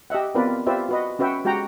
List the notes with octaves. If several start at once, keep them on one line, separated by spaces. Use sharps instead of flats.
G4 D#5 E5 F#5
B3 C4 F4 A#4 B4 D5
F4 G4 B4 C5 D5 E5
F#4 B4 D#5
C#4 F#4 B4 E5 G5
G#3 F#4 G4 G5 A#5